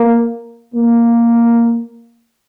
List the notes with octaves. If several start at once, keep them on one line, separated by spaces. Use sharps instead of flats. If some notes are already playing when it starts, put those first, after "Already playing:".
Already playing: A#3
A#3